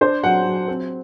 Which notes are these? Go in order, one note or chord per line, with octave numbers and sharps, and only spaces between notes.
D4 C5
F#3 F#5
F#3
C4